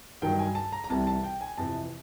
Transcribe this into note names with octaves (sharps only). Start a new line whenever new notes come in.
G2 D#3 F#3 G5
G#5
A5
A#5
A#5
C2 C3 E3 G3 A5
A5
G5
G#5
F2 C3 E3 A5